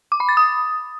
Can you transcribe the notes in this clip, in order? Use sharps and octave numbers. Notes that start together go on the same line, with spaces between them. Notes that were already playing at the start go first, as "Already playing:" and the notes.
D6
B5
A6
D#6